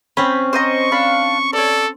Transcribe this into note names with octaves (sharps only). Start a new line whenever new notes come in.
C4 C#4 B5
C5 D#5 A#5 C#6
D4 F5 B5
A4 C#5 D5